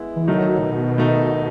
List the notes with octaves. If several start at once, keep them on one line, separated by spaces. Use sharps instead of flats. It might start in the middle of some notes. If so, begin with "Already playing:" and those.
Already playing: G#3 B3 E4
E3
D#3 F#3 A3 D#4
A2
B2
D#3 A3 D#4